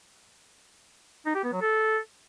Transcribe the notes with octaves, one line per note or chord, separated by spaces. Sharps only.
D#4
G4
B3
F#3
A4